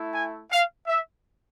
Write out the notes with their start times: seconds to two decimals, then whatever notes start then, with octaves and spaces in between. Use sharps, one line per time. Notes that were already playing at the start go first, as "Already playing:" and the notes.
Already playing: A3 E4
0.12 G#5
0.51 F5
0.87 E5